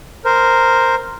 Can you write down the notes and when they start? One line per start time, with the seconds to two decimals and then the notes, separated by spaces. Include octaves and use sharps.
0.25 A#4 C5